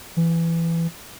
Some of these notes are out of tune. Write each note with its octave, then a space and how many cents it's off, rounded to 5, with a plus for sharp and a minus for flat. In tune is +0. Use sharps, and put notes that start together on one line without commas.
E3 +15